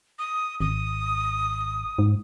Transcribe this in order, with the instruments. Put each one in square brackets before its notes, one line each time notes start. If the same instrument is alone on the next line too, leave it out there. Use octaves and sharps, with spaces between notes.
[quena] D#6
[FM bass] G#1 [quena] D#6
[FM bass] G#2